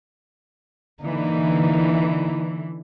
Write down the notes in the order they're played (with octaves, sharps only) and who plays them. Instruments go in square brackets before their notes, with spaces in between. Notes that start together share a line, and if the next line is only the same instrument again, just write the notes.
[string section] D3 E3 [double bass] A#3 D#4